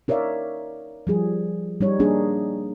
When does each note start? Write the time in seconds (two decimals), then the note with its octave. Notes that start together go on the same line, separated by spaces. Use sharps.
0.08 D#4 A#4 C#5 D5 E5 F5
1.07 F3 G3 G#4
1.81 G3 D#4 C#5
1.99 G3 A#3 D4 D#4 G#4